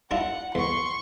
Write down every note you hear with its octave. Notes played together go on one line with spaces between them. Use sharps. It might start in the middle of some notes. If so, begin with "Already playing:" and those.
D4 E4 F4 F#5
E2 C6 C#6